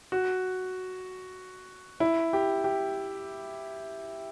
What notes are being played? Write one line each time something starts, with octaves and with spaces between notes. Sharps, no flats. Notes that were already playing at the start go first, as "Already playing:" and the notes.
F#4
E4
G4
G4